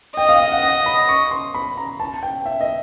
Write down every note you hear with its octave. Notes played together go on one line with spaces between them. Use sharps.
D#5 G5
F5
F5
F#5
F#5
B5
C#6
C6
B5
A#5
A5
G5
E5
D#5